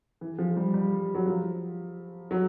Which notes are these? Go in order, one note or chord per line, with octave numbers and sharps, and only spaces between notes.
E3
F3
G3
G3
F#3
F3
F#3